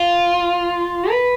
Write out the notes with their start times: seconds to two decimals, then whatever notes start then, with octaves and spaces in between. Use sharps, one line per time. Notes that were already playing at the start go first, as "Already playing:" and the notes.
Already playing: F4
1.10 B4